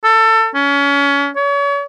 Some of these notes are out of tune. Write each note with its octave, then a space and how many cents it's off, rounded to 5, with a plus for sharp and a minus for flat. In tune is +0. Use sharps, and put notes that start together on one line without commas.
A4 +25
C#4 +30
C#5 +35